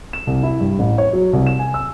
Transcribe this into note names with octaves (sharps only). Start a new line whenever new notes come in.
E7
C2
E4
G2
A1
C#5
F#3
C2
E7
G#5
E6